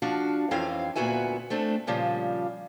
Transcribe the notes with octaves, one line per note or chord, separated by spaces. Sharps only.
F3 D4 F#4 F5
F2 E3 C4 C#4 F5
D2 A#2 B3 F#4 E5 G#5
A3 C4 D4
A#2 C#3 F3 G3